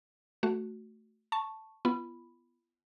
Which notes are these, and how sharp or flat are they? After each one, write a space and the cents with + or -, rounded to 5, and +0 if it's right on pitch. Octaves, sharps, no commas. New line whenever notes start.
A3 +0 F#4 +0
A5 +0 C#6 -5
B3 +0 F4 -40 B5 +0